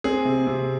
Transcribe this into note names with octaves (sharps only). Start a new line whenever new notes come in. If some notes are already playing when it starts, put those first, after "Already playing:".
C4 G#4
C3
C3